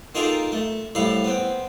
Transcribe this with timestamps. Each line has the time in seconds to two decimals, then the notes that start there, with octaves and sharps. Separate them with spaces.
0.15 A#3 D#4 F4 G#4 A4 G5
0.52 A3
0.95 C2 A2 A4 F5 B5
1.24 B3 C4